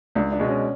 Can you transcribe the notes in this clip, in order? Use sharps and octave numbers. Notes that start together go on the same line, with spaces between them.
C#2 D4
D4
B2 G#3
C#4